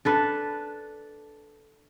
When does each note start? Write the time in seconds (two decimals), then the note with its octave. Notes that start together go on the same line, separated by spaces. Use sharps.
0.05 D4 A4 B4